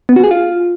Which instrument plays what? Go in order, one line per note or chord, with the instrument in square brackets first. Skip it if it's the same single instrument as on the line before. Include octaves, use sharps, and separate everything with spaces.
[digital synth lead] B3
F#4
G#4
F4